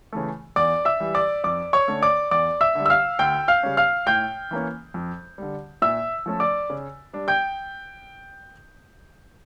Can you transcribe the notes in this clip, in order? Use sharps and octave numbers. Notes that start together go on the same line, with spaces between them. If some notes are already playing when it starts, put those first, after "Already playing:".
C#3 E3 A3
E2 D5 D6
E5 E6
E3 G3
D5 D6
F2 D5 D6
C#5 C#6
D3 A3 C#4
D5 D6
E2 D5 D6
E5 E6
D3 G3
E6
F5 F6
D2 G5 G6
F5 F6
C#3 G3 C#4
F5 F6
A2 G5 G6
E3 A#3 C#4
F2
D3 G3
A#2 E5 E6
F3 A3 C#4
D5 D6
C#3
G3 D4
G5 G6